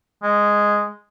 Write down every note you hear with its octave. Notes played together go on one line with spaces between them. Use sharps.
G#3